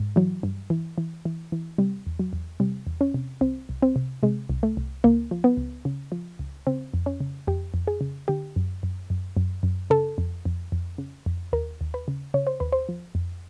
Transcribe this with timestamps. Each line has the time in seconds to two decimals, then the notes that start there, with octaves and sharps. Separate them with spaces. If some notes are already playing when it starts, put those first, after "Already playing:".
Already playing: G#2
0.16 E3 F#3
0.43 G2
0.70 E3
0.98 E3
1.25 E3
1.52 E3
1.78 C3 G3
2.06 E2
2.19 F#3
2.33 E2
2.60 C3 G3
2.87 E2
3.01 C#4
3.14 C3
3.41 C2 C4
3.69 C2
3.82 C4
3.96 C3
4.23 C3 G#3
4.50 C2
4.63 A3
4.77 C2
5.04 C#2 A#3
5.31 F3
5.44 B3
5.57 C#2
5.85 C#3
6.12 F3
6.39 C#2
6.67 C#3 C4
6.94 F2
7.06 C#4
7.20 C#3
7.47 F2 G4
7.74 F2
7.87 G#4
8.01 C#3
8.28 D3 G4
8.56 F#2
8.83 F#2
9.10 F#2
9.37 F#2
9.63 F#2
9.90 C#3 A4
10.18 F2
10.45 F2
10.72 F2
10.98 C#3
11.26 F2
11.53 D#2 A#4
11.81 D#2
11.94 B4
12.08 C#3
12.34 C#3 C#5
12.47 C5
12.60 D#2 B4
12.72 C5
12.89 F3
13.15 F2